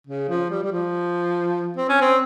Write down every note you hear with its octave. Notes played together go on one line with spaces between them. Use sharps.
C#3
F3
G3
G3
F3
C4
C#4
C4